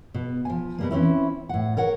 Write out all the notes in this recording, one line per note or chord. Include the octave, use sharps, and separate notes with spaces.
B2
F3 G#5
B2 G3 A#3
E3 C4 C#4 E4
A2 F#5
A#4 C#5 F#5